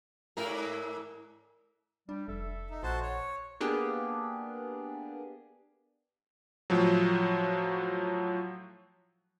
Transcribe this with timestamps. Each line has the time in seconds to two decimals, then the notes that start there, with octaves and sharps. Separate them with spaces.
0.37 G#2 E4 A#4
2.09 G3 D4
2.28 F1 A4 E5
2.70 D#4
2.83 A#1 F#4 C5 A5
3.02 C#5
3.60 A#3 B3 D4 G4 G#4
6.70 A2 F3 F#3